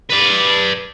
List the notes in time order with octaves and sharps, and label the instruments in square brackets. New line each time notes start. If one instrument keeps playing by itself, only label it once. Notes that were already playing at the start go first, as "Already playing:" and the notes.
[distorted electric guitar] B4 D5